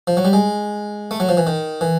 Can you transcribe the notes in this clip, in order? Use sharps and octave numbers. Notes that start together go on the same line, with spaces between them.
F3
F#3
G3
G#3
A3
F#3
F3
E3
D#3
E3